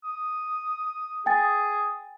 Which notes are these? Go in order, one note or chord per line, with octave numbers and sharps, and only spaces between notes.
D#6
G#4 G5 G#5 A6